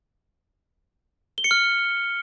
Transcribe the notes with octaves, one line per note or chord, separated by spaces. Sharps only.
G7
C#7
F6